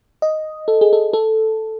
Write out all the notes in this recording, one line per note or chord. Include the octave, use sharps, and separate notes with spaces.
D#5
A4
G#4
A4
A4